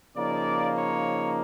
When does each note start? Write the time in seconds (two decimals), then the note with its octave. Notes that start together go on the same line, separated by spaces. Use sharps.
0.16 C#3 F3 A#3 D#4 D5
0.76 C#5